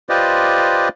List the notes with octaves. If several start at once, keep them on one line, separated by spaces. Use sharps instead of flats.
F4 G4 B4 C5 D5 D#5